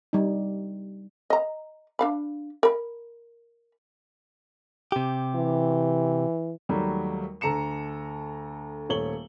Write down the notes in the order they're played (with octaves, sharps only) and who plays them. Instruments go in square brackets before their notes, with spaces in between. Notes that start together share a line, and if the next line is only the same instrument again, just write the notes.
[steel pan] G3 D#4
[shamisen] D#5 A#5
D4 F5 B5
A#4 B5
[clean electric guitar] C3 G4
[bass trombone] E3
[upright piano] D#2 F#3 G3 A3
D2 A4 A#5 C#7 E7
D#1 A3 C#5 F#7 G7